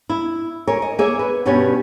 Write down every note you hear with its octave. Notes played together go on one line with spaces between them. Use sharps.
E4
A#4 C#5 G#5
D#5
A#3 G#4 A#4 C#5 E5
B4
G2 B2 G3 B3 C#4 C#5